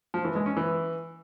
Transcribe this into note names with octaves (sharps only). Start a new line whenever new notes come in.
F3
E3
G#3
C#4
E3